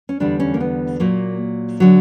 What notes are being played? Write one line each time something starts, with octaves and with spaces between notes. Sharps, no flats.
C#4
E2 D3 G3 D4
C#4
A#3
B3
A#2 F#3 A#3
D3 F#3